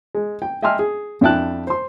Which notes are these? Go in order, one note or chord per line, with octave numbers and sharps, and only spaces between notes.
G#3
G5
D#5 E5 G5 G#5 C6 F6
G#4
F2 D4 E4 G5 A5 F#6
C5 C6